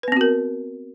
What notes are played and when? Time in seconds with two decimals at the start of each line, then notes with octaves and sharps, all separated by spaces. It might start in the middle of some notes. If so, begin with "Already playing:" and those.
0.03 B4
0.08 B3
0.12 C4
0.17 F#4
0.21 A#4